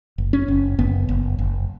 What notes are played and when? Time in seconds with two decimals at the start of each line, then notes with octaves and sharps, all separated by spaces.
0.18 F#1
0.33 C#4
0.48 F#1
0.79 F#1 B3
1.09 F#1
1.39 F#1